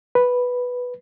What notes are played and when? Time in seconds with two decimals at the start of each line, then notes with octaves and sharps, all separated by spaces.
0.15 B4